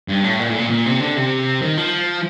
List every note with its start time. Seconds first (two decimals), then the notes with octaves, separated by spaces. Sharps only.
0.08 G2
0.24 A2
0.39 A#2
0.50 A2
0.59 A#2
0.70 A#2
0.86 C3
1.00 D3
1.16 C3
1.62 D#3
1.77 F3